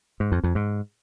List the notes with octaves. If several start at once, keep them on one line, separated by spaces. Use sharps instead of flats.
G#2
F2
F2
G#2